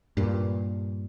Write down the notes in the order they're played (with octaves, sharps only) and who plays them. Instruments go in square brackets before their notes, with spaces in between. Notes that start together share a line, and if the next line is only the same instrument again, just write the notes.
[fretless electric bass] G2 A#2